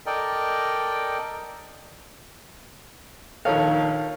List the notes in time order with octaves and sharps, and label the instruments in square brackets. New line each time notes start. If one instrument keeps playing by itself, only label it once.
[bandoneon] A4 A#4 D5 D#5 G5
[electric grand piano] A#1 D#3 [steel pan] A4 A#4 C#5 [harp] F5